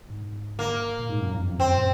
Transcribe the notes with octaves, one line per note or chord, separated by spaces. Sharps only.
G#2
A#3
A#2
G#2
F#2
F2
F2
F#2 C4
A#2